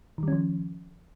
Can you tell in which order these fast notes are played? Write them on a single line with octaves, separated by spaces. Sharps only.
D#3 G3 C#4 F3